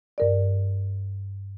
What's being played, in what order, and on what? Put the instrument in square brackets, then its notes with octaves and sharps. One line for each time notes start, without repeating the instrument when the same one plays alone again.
[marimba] G2 A#4 D5